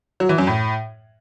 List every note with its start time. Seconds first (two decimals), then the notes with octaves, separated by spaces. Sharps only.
0.20 F#3
0.29 E3
0.38 F#2
0.47 A2